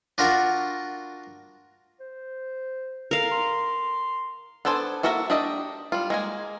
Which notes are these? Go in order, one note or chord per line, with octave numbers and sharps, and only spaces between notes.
D4 F4 F#4 A#4
C5
A4 A#4 F5
C6
B3 D4 A4 C5 G#5
A#3 F#4 A4 A#4 E5
D4 G4 D#5 E5
G3 F4
G#3 A#3 G#5